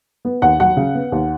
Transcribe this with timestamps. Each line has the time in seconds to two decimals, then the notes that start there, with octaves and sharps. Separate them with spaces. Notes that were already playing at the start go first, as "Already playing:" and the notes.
0.25 B3
0.42 D#2 F#5
0.60 F#3 F#5
0.77 C#3
0.95 B3
1.12 D#2